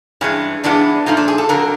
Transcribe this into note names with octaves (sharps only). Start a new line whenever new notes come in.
G2 E3 G#3 C#4
G2 E3 G#3 B3 D4
A#2 F3 A3 D#4
D4
G#4
A4
F2 D3 F#3 A#4